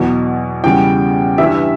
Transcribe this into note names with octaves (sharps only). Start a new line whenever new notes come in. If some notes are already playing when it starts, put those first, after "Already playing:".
Already playing: E2 B2 F#3
E2 C#3 G3 G5
G2 E3 G3 E5